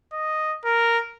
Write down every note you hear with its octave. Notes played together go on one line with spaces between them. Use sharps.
D#5
A#4